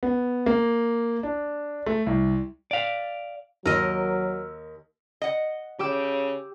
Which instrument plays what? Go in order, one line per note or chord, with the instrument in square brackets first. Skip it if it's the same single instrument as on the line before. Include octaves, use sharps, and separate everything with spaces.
[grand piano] B3
A#3
D4
A3
C2
[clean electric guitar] D5 F5
[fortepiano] D#2 [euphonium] F#3 [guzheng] A#4 D#5 [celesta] E6 F6
[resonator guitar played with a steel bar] D#5 F#5
[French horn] C#3 [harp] G4 D6 E6